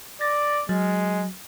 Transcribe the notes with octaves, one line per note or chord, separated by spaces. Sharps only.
D5 A6 A#6
F#3 G#3